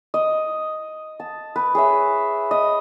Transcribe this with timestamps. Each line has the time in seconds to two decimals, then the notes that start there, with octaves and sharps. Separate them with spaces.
0.14 D#5
1.20 A5
1.56 B4
1.75 G#4 C#5 E5
2.51 D#5